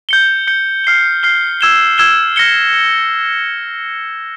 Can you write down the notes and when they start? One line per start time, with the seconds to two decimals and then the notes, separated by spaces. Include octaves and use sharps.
0.09 G6 C#7 G7
0.47 G6 C#7 G7
0.84 F6 C7 G7
1.23 F6 C7 G7
1.61 E6 G#6 E7 G7
1.98 E6 G#6 E7 G7
2.36 F6 A#6 C#7 G7